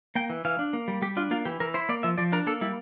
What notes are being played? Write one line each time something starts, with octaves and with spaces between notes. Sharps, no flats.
A#3 G5
E3
E3 F5
D4
A#3
G3
G3 G4
D4 F4
A#3 F4
E3 G4
E3 A#4
E4 C5
A#3 D5
F3 E5
F3 D5
D4 A#4
A#3 A4
G3 E4